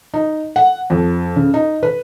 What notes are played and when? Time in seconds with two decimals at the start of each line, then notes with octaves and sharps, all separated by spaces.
0.14 D#4
0.56 F#5
0.90 F2
1.36 C#3
1.54 D#4
1.83 B4